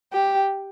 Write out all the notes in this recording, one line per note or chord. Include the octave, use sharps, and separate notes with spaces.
G4